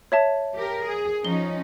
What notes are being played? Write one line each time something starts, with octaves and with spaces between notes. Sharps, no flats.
C#5 E5 A5
G4 A#4
G#4
F3 C#4 D#4 G7